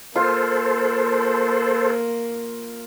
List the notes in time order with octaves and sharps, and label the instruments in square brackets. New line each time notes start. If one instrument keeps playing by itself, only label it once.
[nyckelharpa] A#3 [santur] F4 [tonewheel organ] A4 C5